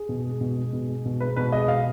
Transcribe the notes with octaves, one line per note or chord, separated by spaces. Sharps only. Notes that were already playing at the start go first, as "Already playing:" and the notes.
Already playing: G#4
B2
G#3
B2
G#3
B2
G#3
B2
G#3 B4
B2 B4
G#3 D#5
B2 F5